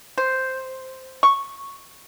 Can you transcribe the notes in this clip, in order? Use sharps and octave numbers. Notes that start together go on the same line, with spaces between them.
C5
C#6